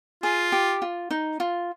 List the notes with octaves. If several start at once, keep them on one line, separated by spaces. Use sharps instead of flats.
F4 G#4
G4
F4
D#4
F4